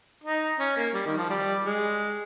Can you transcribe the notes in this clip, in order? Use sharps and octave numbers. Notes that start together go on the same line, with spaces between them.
D#4
C#4
A#3
G3
D#3
F3
G3
G#3